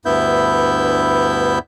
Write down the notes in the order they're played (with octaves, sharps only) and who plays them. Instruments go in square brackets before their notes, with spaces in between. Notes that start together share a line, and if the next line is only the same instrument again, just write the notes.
[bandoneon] D2 G2 B3 E4 E5 G6